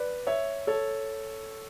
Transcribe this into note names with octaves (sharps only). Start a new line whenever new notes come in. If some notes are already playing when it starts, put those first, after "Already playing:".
Already playing: B4 D5
C#5 E5
A4 C#5